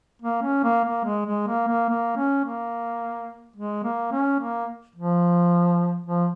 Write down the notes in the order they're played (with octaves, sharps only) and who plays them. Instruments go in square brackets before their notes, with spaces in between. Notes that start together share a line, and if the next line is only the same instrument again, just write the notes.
[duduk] A#3
C#4
A#3
A#3
G#3
G#3
A#3
A#3
A#3
C#4
A#3
G#3
A#3
C#4
A#3
F3
F3